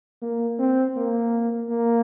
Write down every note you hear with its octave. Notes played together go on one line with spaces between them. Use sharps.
A#3
C4
A#3
A#3